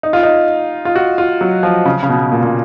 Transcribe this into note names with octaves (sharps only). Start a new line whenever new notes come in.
D#4
F4
D#4
F4
F#4
F4
F#3
F3
C#3
C#3
B2
A#2
A#2